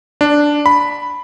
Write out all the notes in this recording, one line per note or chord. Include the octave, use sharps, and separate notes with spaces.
D4
B5